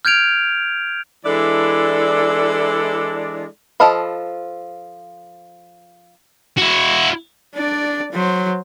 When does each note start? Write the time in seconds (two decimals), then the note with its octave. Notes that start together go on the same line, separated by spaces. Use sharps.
0.05 F6 G6 G#6 D7 F7
1.25 E3 G#3 D4 E4 A4 D5
3.80 F3 A4 D#5 F5 B5
6.57 E4 F#4
7.55 D4 D5
8.12 F#3 C5